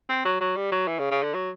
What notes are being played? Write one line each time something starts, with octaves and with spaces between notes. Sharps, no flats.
C4
F#3
F#3
G3
F#3
E3
C#3
C#3
D3
F#3